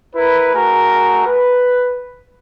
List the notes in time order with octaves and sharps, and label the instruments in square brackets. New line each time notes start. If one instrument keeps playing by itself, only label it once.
[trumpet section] E4 A#4 B4
A3 F#4 G#4 A#4
B4